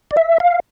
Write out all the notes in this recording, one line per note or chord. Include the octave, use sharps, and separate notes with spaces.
D5
E5
F5